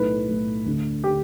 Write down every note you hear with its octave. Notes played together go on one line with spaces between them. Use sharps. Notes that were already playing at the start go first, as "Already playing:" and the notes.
Already playing: B1 A2 A3 B4
B1 A2 A3
D2 D3 A3
D3 A3 G4